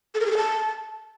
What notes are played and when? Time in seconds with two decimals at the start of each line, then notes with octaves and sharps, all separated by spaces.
0.14 A4
0.20 A#4
0.26 G#4
0.31 A4
0.37 A5